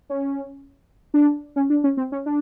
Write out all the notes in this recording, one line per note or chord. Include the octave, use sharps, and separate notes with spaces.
C#4
D4
C#4
D4
C#4
C4
C#4
D4